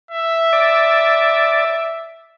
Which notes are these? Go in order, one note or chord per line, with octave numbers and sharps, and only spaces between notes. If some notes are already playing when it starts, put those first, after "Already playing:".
E5
D5